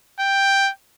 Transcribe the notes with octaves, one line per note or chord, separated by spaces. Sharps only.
G5